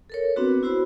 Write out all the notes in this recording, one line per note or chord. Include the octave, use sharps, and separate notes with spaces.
A4 A#4 C#5
B3 C4 D4 F#4 B4
E4 F#4 C5 B5